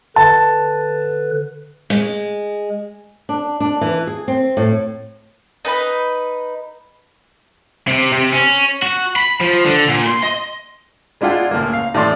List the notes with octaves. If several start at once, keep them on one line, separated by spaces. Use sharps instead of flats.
D3 B4 A5
G#3
D4
D4
E3
G#4
C4
A2
D#4 B4 B5
C3
C3
C#4
F#4
B5
F3
D3
A#2
C6
D#5
G#3 D4 E4 F4 F#5 G5
C#2 A2 A#3
F5
A2 E3 D5 C6